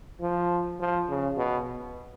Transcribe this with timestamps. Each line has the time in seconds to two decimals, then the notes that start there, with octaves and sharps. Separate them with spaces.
0.21 F3
0.80 F3
1.09 C#3
1.37 B2